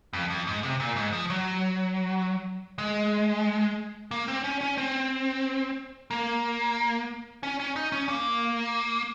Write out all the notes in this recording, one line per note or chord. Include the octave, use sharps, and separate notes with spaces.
F2
F2
G#2
C3
A#2
G#2
F3
F#3
G#3
A#3
C4
C#4
C#4
C4
A#3
C#4
C#4
D#4
C#4
A#3